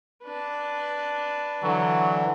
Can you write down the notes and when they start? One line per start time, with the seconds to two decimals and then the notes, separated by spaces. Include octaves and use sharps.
0.23 D4 B4
1.63 D3 E3 F#3